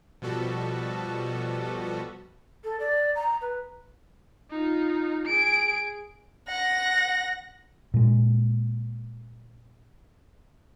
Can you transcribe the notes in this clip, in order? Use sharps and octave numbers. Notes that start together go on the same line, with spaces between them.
B2 F3 G3 B3 F#4 A4
A4
D5
A#5
B4
D#4 F4
G#4 D7
F#5 A#6
A#2 G#3